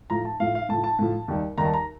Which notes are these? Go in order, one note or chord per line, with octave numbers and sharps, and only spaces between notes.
A2 F3 A#5
A5
A2 F3 F5
F5
A2 F3 A5
A5
A2 F3
D#2 D#3 G3
D#2 D#3 G3 A#5
A5
A#5